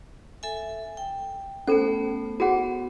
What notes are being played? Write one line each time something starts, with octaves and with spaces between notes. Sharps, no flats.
A4 E5 G#5
G5
A3 B3 C#4 A4 C5
B3 F#4 G#4 F#5